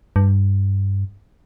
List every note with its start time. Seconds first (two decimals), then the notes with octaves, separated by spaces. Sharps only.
0.16 G2